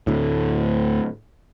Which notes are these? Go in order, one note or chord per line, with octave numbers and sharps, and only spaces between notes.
D2 A2